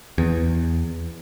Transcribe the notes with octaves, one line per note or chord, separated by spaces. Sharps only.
E2